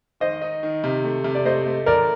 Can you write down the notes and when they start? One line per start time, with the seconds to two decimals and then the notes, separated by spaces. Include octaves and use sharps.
0.20 D#3 C5 D#5
0.41 D#4
0.63 D#3
0.84 C3
1.04 A3
1.24 C3
1.35 D5
1.45 A3 C5 D#5
1.66 A3
1.86 A1 A#4 D5